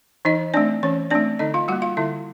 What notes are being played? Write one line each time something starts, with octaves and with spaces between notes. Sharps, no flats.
E3 D#4 D#5
A3 C4 D4 D5
E3 C#4 C#5
A3 C4 D4 D5
D3 D#4 D#5
F4 F5
G3 A#3 F#4 F#5
F4 F5
D3 E4 E5